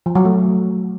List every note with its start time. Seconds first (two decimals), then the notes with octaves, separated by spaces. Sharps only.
0.06 F3
0.15 F#3
0.25 A3